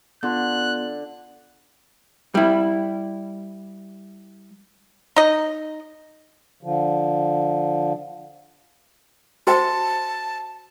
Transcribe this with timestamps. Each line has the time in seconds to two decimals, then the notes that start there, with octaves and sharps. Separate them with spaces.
0.23 D3 B3 F4 C6 F#6
2.35 G3 E4
5.16 D#4 D#5
6.63 D3 F3
9.47 F#4 C5 G5 A5